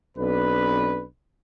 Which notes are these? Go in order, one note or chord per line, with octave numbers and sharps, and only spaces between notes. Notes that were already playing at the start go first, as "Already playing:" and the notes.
B1 C4 D4 B4